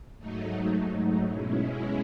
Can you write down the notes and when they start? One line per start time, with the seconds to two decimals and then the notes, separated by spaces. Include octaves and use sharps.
0.19 G#2 F#3 A3 D#4
1.26 B2 G#3 C#4 E4